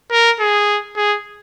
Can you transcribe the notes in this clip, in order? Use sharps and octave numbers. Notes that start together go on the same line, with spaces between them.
A#4
G#4
G#4